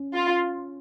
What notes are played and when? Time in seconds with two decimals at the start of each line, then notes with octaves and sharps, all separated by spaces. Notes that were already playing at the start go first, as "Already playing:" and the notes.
Already playing: C#4
0.15 F4